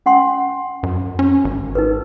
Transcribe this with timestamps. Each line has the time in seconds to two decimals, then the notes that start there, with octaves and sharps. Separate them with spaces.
0.06 C#4 F#5 C6
0.83 F#2
1.19 C#4
1.44 G#1
1.75 D#4 A#4 B4